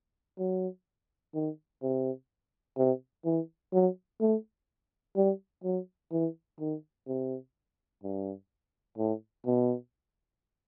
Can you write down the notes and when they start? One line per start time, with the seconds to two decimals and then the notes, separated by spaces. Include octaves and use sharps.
0.39 F#3
1.34 D#3
1.82 C3
2.78 C3
3.25 E3
3.73 F#3
4.20 A3
5.16 G3
5.64 F#3
6.12 E3
6.60 D#3
7.07 C3
8.03 G2
8.98 A2
9.46 B2